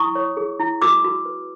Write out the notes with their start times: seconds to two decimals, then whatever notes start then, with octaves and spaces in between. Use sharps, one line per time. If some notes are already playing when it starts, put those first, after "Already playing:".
Already playing: E4 C#6 D#6
0.15 C#5
0.37 G#4
0.60 E4
0.82 F#4 D6 E6
1.04 F#4
1.25 B4